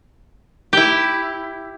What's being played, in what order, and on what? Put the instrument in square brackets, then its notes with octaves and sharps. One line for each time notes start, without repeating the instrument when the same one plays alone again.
[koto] E4 G4